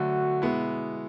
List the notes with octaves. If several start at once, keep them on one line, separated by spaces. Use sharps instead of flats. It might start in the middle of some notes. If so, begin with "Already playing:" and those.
Already playing: D3 F#3 A3 F#4
B2 G#3 B3 E4